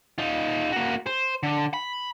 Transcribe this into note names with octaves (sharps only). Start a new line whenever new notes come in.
D#4 F4
A#3 F#4
C5
D3
B5